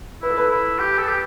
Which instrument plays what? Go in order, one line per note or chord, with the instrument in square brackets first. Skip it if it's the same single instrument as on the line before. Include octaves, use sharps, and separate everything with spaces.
[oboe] E4 [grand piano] B4
[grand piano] A4
B4
[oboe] E4
G4
A4
G4